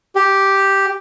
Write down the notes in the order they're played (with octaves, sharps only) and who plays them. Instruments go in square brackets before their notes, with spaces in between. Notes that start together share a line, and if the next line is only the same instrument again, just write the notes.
[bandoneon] G4